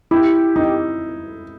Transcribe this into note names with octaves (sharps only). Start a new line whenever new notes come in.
E4 G4
D#4